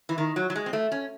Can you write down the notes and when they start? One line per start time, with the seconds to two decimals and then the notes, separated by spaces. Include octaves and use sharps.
0.09 E3
0.18 D#3
0.36 F#3
0.50 F#3
0.56 G#3
0.66 C4
0.73 A3
0.92 C#4